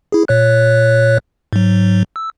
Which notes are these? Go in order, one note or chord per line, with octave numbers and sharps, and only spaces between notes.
E4 G#4
A#2 C#5 F#6
G#2 F#3
E6